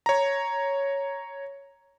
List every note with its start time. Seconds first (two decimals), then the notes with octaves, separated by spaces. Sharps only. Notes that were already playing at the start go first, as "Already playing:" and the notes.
0.06 C#5 A#5